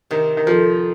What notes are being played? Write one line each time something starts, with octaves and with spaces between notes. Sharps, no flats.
C3 D#3
D#3
F2 F3